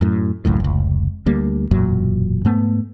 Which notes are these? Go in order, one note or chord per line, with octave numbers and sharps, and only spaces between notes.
F#2 A2
G#1 C#2 F#2 A2
F1 C#2
D2 G3 A#3
E1 F#2 A#2 F#3
G#2 A3 B3